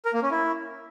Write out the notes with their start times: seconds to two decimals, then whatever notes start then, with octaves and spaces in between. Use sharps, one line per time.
0.05 A#4
0.14 A#3
0.22 C#4
0.31 E4